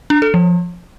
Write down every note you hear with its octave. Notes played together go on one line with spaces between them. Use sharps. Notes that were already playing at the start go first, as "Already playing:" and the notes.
D4
A4
F3